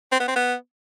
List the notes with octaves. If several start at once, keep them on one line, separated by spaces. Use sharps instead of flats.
C4
B3
C4
B3